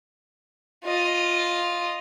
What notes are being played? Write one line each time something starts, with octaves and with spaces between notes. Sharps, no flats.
F4 D#5